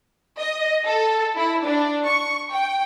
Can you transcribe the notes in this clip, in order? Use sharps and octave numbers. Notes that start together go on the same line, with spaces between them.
D#5
A4
E4
D4
C#6
G5